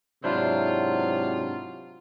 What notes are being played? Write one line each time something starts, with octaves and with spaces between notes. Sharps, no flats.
G#2 C3 F#3 D4 E4 F4 C5